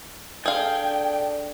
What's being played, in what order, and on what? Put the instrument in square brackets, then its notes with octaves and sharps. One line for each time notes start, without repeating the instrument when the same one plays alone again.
[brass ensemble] D4 A4 D5 [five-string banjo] G#4 F5 [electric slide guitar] G5